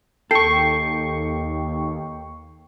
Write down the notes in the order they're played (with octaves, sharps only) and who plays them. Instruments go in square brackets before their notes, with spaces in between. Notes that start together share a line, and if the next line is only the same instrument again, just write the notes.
[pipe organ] D#2 [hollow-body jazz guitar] A4 [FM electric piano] G5 C#6 [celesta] C7